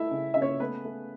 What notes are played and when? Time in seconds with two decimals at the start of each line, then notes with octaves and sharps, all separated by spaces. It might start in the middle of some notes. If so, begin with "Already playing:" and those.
Already playing: A3 E4 E5
0.11 C#3
0.34 C#3 E5
0.41 C#4 C#5
0.60 A3 B3 B4
0.85 A3